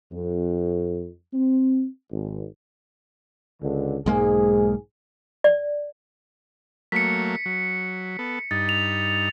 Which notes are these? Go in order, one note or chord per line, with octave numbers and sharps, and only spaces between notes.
F2
C4
G#1
C#2 D3
B1 G#2 G#3 A#3 G#4
D5
F#3 A3 A#3 B6 C#7
F#3
B3 A4
G2 D#4 A6
F7